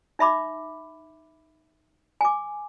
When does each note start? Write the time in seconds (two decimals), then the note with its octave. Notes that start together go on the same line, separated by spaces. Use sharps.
0.19 D#4 E5 B5 D6
2.21 G#5 D6